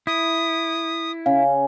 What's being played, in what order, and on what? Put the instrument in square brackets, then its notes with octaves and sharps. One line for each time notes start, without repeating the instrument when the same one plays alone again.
[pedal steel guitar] E4 [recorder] D#6
[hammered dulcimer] C#3 [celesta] F5